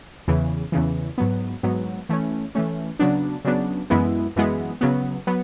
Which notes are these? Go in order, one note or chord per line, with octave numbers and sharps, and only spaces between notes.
E2 C#3 E3
E2 C#3 E3
G#2 F#3 B3
G#2 F#3 B3
E3 A3 C#4
E3 A3 C#4
C#3 F#3 B3 D4
C#3 F#3 B3 D4
F#2 E3 G#3 B3 E4
F#2 E3 G#3 B3 E4
C#3 F#3 B3
F#3 B3